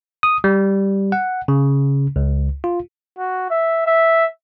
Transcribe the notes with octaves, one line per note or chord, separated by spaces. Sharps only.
D#6
G3
F#5
C#3
C#2
F4
F#4
E5
E5